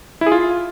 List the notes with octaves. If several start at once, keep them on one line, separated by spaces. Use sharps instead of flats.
E4
G#4
F4